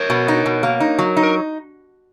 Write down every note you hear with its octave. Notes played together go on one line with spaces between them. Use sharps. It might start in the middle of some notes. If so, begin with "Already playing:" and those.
Already playing: A#4 C#5
B2
D#4
B2
A#3
D#4
F#3
D#4
A#4